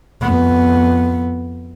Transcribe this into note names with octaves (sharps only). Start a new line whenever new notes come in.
F2 B3